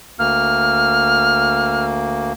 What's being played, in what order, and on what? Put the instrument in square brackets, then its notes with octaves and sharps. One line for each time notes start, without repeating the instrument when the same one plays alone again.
[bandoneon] D2 A#3 [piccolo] F6